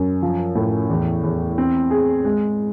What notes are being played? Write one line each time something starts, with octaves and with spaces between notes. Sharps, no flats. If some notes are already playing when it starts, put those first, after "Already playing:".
Already playing: F#2
F3
A2
E2
E2
C4
G#4
G#3